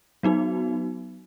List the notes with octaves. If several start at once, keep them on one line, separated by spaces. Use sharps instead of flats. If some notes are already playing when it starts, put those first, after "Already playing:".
F#3 B3 D#4 F#4